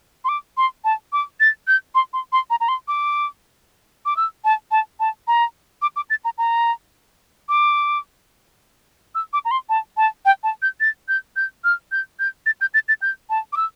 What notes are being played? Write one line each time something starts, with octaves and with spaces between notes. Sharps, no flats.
C6
D6
C6
A5
D6
A6
G6
C6
C6
C6
A#5
A#5
C6
D6
D6
E6
A5
A5
A5
A#5
D6
D6
A6
A#5
A#5
D6
E6
D6
A#5
C6
A5
A5
G5
A5
G6
A6
G6
G6
F6
G6
G6
A6
G6
A6
A6
G6
A5
D6
E6